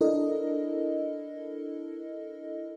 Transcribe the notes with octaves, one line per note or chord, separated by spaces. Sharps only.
D4 E4 A4 A#4 D#5